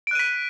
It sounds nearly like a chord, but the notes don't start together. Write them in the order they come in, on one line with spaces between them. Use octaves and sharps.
D7 F#6 D#7 B6